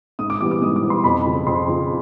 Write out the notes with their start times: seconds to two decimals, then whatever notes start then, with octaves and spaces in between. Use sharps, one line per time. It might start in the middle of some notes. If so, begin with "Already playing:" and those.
0.19 G#2 D#6
0.30 D6
0.40 E3 G3 B3 D6
0.51 D6
0.62 G#2 D#6
0.76 D6
0.83 E3 G3 B3
0.90 C6
1.04 F2 B5
1.26 C#3 F3
1.47 F2 C6
1.68 C#3 F3